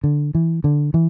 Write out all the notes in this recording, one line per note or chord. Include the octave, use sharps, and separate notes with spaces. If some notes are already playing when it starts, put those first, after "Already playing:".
D3
E3
D3
E3